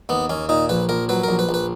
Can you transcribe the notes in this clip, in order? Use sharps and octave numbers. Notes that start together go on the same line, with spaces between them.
D#2 B3
D#2 C#4
A#2 D#4
A#1 B4
A#1 A#4
F#3 B4
A#1 A#4
B4
A#1
B4